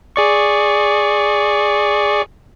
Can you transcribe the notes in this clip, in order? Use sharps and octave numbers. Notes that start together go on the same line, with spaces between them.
G#4 D5 C#6